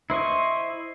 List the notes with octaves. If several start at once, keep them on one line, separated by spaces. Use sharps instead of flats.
E4 C5 D#5 C#6